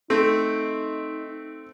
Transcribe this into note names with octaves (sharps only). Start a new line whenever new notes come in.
A3 C4 D#4